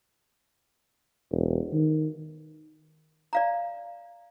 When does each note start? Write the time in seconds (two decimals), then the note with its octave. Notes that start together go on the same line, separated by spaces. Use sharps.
1.32 E1
1.73 D#3
3.33 D5 F5 A#5